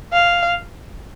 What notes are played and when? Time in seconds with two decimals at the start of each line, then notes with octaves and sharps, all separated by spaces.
0.13 F5